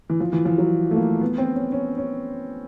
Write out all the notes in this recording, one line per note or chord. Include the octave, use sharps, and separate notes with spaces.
E3
F3
E3
F3
F#3
A3
A#3
B3
C4
C#4
C#4
C#4